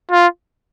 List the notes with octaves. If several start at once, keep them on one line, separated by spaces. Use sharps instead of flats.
F4